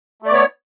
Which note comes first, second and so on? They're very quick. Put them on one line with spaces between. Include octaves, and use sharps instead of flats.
A3 D5 B3 C#5